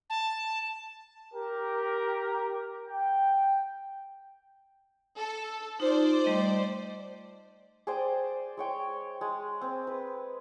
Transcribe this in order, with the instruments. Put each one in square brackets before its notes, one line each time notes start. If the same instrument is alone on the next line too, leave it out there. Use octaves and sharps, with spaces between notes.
[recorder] A5
[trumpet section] G4 A#4
G5
[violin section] A4
[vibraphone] D#4 F4 [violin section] C5 D5
[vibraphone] G3 A3 D#5
[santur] G#4 C5 D5 G5
G#3 C#5 G5
G#3
C4
B4